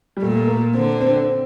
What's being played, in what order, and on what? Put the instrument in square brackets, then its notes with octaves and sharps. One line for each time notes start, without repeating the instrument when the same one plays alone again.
[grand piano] G3
[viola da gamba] A#2 [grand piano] A3
[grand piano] A3
A#3
[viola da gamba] D3 [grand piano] C4
[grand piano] C4
D4
C4